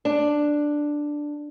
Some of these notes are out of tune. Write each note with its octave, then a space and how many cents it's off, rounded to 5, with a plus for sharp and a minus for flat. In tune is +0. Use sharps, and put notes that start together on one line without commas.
D4 +5